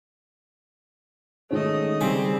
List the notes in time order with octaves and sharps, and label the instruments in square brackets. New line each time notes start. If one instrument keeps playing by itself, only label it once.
[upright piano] D#3 G#3 C#4 [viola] A3 D#5
[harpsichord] C#3 G#5 B5 [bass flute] G3 [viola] C4